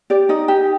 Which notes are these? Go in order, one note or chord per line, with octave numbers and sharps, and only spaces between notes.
G4 D5
D#4 D#5
G4